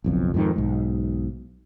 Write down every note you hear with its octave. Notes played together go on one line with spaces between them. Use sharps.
F#1 B1 F2
F2 G#2 C3 D#3
B1 G#2